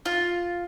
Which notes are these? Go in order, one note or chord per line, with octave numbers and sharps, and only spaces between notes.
F4